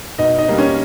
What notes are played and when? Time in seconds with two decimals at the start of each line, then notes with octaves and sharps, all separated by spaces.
0.18 B2 D#4 D#5
0.38 D#4 D#5
0.48 G3 A#3
0.58 C#4 C#5